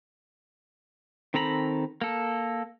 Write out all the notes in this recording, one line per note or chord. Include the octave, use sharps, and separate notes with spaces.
D#3 C4 A4 A#5 B5
A#3 A4